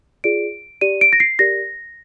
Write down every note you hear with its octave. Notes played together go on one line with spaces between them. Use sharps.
F4 G#4 D5 D7
G4 D5 D#7
D7
A#6
C7
G4 A#4 D5 A#6